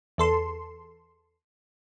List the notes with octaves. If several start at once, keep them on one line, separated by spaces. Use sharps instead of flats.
E2 A4 C6